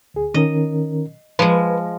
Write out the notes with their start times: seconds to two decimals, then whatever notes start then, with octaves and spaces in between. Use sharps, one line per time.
0.14 D2 G#4
0.34 D#3 C#4 A#4 D#5
1.39 F3 G#3 B4